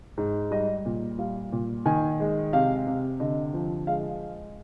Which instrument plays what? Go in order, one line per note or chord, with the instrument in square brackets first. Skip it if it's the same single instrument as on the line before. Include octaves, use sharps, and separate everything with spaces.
[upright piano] G#2
G3 D#5
A#2
G3 F5
A#2
D#3 G#5
G#3
C3 F5
C3
D3 D#5
F3
G#3 F5